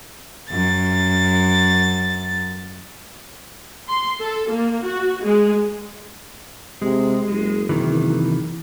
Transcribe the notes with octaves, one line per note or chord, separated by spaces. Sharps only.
F#2 A6
C6
A4
A#3
F#4
G#3
C3 G#3
F#1
C3 D#3 E3